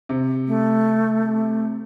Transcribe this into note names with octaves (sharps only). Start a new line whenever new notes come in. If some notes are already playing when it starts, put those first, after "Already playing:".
C3
A3